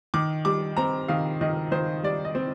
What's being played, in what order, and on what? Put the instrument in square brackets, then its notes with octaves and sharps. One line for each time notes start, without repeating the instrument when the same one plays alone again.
[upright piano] D#3 D6
G3 D6
C4 A#5
D#3 F5
D#3 D#5
D#3 C5
G3 D5
D#5
C4